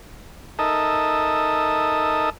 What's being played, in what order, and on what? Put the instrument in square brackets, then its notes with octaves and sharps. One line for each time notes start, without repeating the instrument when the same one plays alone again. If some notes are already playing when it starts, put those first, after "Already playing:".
[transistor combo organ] D#4 A4 A#4 D#5 E5